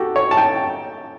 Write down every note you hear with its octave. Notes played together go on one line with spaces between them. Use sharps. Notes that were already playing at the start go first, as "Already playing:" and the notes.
Already playing: F#4 G4 A4
C#5
A5
G5